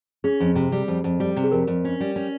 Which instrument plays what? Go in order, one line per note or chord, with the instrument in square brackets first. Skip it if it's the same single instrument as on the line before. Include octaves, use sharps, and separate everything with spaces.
[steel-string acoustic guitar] C#4 [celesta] G#4
[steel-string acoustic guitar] F2
C3
G3
F2
F2
G3
C3
[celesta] G#4
[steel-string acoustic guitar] F2 [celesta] A#4
[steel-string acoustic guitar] F2
C#4
G3
C#4